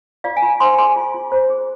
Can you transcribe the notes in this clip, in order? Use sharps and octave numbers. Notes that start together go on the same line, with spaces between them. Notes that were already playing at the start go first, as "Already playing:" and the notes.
F4 D5 F5
F5 G#5
F4
C5 G#5 C6
G#4 G#5 C6
F4
F4
C5
G#4